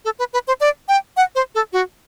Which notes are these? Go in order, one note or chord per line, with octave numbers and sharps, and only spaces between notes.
A4
B4
B4
C5
D5
G5
F#5
C5
A4
F#4